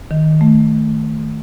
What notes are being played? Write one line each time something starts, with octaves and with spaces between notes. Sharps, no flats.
D#3
A3